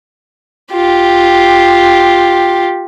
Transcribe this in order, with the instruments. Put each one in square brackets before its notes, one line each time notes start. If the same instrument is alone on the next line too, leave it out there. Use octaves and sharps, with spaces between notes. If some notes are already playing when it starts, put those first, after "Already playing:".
[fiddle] F4 G4